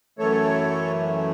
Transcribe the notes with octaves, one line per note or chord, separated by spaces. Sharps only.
F#2 E3 A3 A4 C#5